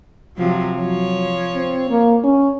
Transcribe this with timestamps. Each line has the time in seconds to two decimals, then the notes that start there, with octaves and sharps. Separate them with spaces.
0.37 C3 F3 F#3
0.77 F3 F#3 C#5
1.55 C4
1.90 A#3
2.24 C#4